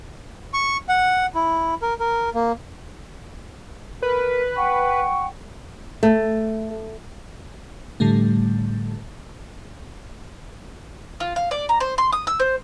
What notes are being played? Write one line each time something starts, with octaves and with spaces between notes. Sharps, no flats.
C#6
F#5
E4
A#4
A#4
A#3
A#4 B4
F#5 G5 C#6
A3
A2 D3 G3 A3
F4
F5
D5
A#5
C5
C6
D#6
E6
C5